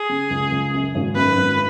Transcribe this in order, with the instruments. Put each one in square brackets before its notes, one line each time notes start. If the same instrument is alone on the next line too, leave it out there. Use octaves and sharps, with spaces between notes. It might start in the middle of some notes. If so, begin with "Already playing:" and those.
Already playing: [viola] G#4
[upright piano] C#3
C#2
C#2
F#2
G#1
[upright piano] F#2 [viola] B4
[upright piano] G#1